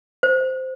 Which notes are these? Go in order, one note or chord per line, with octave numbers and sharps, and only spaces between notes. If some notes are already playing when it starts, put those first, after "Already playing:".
C5